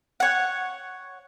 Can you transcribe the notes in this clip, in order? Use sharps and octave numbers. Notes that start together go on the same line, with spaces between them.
C#5 F#5